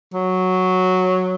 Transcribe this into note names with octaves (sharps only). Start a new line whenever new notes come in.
F#3